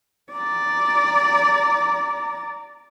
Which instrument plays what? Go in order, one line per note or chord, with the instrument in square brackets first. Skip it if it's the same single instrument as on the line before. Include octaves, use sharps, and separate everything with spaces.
[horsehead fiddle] D5 A#5